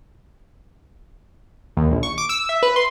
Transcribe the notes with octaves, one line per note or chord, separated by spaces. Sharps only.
D#2
A#1
C#6
D6
E6
E5
B4
C6